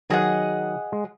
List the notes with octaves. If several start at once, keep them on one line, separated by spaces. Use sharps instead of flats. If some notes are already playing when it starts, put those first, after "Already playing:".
D#3 F#3 G#4 D#5 F#5
G#3